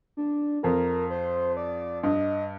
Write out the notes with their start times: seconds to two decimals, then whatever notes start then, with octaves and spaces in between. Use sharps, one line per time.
0.17 D4
0.63 F2 A#4
1.10 C5
1.57 D5
2.03 G2 D#5